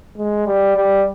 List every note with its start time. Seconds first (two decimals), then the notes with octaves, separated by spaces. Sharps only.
0.17 G#3
0.46 G3
0.76 G3